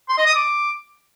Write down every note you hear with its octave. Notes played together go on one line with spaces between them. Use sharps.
C6
D#5
D#6
D6